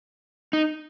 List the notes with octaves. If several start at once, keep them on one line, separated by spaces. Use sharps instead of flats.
D#4